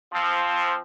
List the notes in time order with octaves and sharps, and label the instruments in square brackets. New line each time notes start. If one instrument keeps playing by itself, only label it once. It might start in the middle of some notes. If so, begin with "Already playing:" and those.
[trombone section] F3 C4